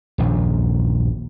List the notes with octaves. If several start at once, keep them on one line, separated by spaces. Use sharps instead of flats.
D#1 A#1 F#2